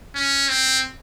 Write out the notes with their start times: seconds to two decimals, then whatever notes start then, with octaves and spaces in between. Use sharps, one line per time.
0.15 C#4
0.49 C4